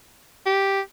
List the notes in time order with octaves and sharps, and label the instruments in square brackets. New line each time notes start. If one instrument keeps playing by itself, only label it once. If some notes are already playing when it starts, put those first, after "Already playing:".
[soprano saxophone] G4